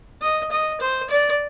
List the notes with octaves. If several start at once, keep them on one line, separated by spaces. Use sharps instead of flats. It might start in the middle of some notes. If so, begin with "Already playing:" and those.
D#5
D#5
C5
D5